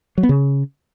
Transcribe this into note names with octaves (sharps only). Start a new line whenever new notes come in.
F#3
B3
C#3